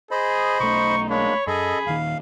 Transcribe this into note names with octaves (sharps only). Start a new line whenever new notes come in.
G#4 C5 D#5 B5
B1 A3 D#4 C#6
G#3 A#3 D4 C#5 B5
F#2 G#4 A4 D#5 B5
D#1 D#3 F5